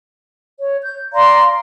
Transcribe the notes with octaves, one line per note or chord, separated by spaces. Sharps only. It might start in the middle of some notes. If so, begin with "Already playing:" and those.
C#5
G6
D5 F5 A#5 C6